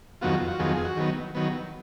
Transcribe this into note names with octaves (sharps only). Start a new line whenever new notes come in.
F2 D#3 F#3 B3 F4 F#4
F4
F#4
F2 D#3 F#3 B3 F4 G#4
G#4
F#4
D#3 F#3 B3
D#3 F#3 B3